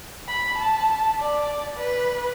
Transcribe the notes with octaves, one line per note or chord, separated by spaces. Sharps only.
B5
A5
D5
B4